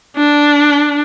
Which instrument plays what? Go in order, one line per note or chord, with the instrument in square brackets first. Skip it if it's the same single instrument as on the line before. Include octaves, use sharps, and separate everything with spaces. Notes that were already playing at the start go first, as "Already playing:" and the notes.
[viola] D4